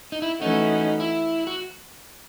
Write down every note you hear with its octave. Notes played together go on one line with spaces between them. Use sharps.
D#4
E4
E3 A3 C#4 D#4 F#4
E4
F#4